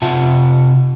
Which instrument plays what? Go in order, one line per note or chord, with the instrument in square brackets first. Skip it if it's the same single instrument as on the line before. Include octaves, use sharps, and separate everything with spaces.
[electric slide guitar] C3 F4 E5 F#5 A5